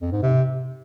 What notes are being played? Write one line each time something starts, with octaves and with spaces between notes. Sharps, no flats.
F2
G#2
C3